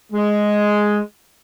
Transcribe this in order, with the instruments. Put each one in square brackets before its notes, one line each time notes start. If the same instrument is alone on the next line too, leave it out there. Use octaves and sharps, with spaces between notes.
[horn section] G#3